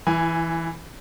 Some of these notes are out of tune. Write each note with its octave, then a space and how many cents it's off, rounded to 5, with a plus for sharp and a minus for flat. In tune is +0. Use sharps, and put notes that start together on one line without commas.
E3 +0 E4 +35 G#5 +0